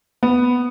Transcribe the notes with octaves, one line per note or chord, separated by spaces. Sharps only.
B3